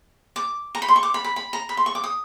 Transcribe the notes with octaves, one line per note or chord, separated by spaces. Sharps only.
D6
A#5
B5
C6
C#6
D6
B5
B5
B5
A#5
B5
C6
C#6
D6
D#6